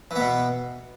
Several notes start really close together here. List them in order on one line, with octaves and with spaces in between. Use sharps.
E3 B3 B2